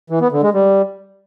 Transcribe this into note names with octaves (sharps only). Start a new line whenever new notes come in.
E3
B3
D3
G#3
G3